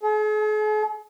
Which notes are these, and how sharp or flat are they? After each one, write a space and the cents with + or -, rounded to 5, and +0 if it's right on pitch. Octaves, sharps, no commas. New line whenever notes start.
G#4 +45